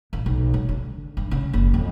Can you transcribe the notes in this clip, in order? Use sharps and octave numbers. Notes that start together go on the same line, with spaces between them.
A1
B1
F#3
D3
G2
C#3
F#1
F2